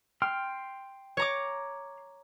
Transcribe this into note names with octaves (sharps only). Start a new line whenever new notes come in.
G5 C6 F6
C#5 A#5 D6